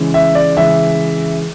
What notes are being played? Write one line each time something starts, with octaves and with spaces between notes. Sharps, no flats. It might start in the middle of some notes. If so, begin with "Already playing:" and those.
Already playing: C#3 E3 G#3
E5
D5
C#3 E3 G#3 E5